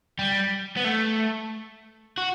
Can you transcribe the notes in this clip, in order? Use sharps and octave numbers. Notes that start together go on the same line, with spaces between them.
G3
B3
A3
F#4